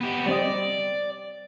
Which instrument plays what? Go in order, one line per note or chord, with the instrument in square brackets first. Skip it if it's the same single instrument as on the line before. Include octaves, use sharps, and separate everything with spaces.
[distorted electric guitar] B3 G4
[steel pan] G3 C4 D#5 [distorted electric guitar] D5